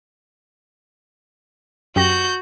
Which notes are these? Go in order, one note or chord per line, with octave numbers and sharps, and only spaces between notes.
F#2 F#4 G4 G6 A#6